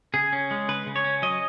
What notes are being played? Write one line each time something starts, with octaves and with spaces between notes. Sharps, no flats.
C#3 G#4
C#4
G#3
C#3 B4
C#3
C#5
C#4
F#3 D#5